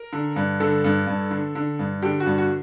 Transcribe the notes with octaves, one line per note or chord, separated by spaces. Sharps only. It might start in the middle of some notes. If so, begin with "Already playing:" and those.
Already playing: A#4
D3
G2
D3 A4
G2
G2
D3
D3
G2
D3 G4
F#4
G2
F#4